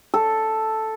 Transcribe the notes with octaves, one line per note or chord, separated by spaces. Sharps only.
A4